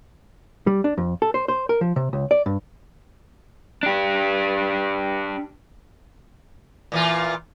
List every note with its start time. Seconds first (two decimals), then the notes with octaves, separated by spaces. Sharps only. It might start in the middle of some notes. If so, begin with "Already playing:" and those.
0.67 G3
0.84 D4
0.98 F2
1.22 A4
1.34 C5
1.48 C5
1.69 A#4
1.81 F3
1.96 C3
2.13 C#2
2.31 D5
2.46 G2
3.83 D4 G4
6.92 A#2 E3 F4